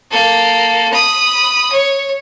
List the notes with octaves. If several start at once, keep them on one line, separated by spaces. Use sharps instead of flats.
A#3 A4
B5 D#6
C#5